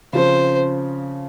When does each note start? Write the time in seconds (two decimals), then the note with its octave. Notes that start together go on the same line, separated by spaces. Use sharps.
0.13 C#3 F3 C4 C5